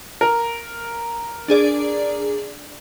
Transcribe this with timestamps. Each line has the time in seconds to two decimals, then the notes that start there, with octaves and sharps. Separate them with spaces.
0.21 A#4
1.48 D4 G#4 D5